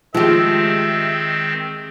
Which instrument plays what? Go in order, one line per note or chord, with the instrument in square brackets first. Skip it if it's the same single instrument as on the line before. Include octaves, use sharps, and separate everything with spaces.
[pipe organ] D#3 C4 [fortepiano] F3 [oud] G#3 G4 [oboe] E5